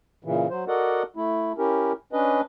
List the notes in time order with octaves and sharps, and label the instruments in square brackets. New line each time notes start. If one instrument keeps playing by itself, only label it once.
[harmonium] A#2 C#3 E3
F#3 C5
F#4 A4 A#4 D5 D#5 F#5
A3 E4
C#4 E4 G4 A#4
C#4 D4 B4 D#5